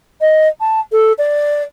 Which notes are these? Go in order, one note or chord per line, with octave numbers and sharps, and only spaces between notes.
D#5
A5
A4
D5